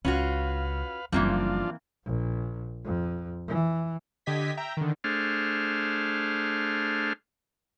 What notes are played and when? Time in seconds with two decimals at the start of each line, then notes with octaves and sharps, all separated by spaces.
0.05 C#2 C#4 F4 F#4 B4 F5
1.12 F#1 E3 F3 G3 A#3 C4 D4 F4
2.05 A#1
2.85 F2
3.48 E3
4.26 D3 G4 D#5 G#6 B6
4.57 E5 G5 A#5
4.77 D3 D#3
5.04 A3 D4 G#4 C5 F6